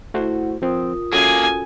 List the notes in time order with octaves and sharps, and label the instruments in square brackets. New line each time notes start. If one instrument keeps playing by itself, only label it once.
[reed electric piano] A3 F#4 C5 [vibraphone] E4 F#5
[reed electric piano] F3 C4 [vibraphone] F4 A#4 D#6
[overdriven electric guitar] A#3 G#4 [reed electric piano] C#4 F#4 A4 [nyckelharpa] G#5